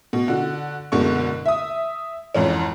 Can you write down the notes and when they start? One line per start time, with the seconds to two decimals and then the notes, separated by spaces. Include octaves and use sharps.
0.13 B2
0.28 D3 F#4
0.92 F#1 B2 D3 G#3 C#6
1.46 E5 D#6
2.35 F2 G#2 E3 C#4